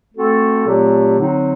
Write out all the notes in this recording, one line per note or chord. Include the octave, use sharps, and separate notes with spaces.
A3 C4 F#4 A4
A#2 F#3 A3 C4 G4
D3 F#3 C4 D#4